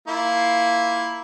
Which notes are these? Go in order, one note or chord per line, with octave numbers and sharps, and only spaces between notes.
A#3 E4 F4